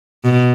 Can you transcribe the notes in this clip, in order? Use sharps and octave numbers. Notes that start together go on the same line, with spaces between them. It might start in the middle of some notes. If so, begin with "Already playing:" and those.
B2